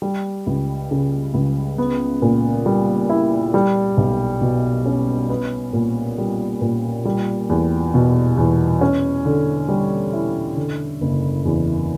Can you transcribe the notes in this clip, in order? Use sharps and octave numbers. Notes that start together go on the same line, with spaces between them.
G3
C#2
C#3
C#2
B3
A#2
G3
E4
G3
B1
B2
C#4
B3
A#2
G3
A#2
G3
E2
B2
E2
C#4
D3
G3
E4
D3
F#1
E2